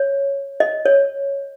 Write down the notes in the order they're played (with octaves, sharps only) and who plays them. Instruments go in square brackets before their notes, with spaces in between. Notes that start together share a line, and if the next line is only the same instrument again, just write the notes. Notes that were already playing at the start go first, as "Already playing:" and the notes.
Already playing: [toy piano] C#5
D#5
C#5